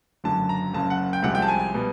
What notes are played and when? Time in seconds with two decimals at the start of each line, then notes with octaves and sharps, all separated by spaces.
0.24 F#1 F#2 D3 F#3 A5
0.49 A#5
0.74 F#1 F#2 C#3 A5
0.90 F#5
1.13 G5
1.22 C2 C3 F3 G#3 F#5
1.35 G5
1.42 A5
1.48 G#5
1.59 G#5
1.74 B2 G3